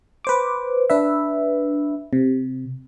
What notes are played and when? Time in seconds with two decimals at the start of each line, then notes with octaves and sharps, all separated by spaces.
0.25 B4 C5 D6
0.90 D4 B4 E5
2.13 C3